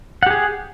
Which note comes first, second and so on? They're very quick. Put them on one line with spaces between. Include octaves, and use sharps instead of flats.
F#5 G4 G#4